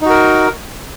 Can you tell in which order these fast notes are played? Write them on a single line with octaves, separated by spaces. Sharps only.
D#4 F#4 A#4